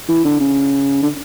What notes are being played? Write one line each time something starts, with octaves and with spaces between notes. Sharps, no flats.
E3
D3
C#3
D3